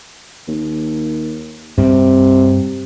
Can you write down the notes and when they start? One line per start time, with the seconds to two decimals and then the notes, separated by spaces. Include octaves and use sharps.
0.48 D#2
1.78 G2 C3 G3